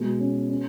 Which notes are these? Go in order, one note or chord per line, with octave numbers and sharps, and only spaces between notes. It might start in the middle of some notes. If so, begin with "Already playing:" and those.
Already playing: B2 G#3
C#4
C#4